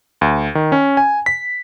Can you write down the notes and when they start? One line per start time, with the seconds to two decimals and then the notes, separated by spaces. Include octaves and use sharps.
0.21 D2
0.55 D#3
0.72 C#4
0.97 G#5
1.26 B6